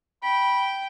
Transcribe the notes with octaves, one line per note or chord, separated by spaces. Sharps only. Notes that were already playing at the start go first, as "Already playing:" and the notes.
G5 B5